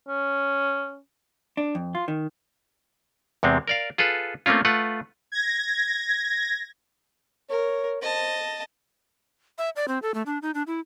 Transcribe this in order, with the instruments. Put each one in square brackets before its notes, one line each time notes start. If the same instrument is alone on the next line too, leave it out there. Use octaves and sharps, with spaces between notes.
[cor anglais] C#4
[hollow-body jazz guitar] D4
F2
F4
D#3
[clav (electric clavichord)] E2 C3 G#3 C4
A#4 D5 F5
F4 G#4 A4 B4
A3 A#3 C4 C#4 F4
A3 F4 B4 F#5
[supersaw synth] G#6 A#6
[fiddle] A#4 [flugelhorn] C#5
[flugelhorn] C5 [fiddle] D#5 A5
[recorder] E5
D5
C4
A4
A3
D4
D#4
D4
E4